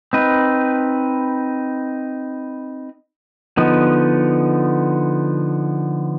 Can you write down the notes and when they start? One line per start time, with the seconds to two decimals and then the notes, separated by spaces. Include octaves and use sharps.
0.13 C4 D#4 B4
3.57 D3 F3 B3 D#4